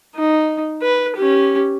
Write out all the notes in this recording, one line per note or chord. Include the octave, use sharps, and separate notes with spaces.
D#4
B4
C#4 G4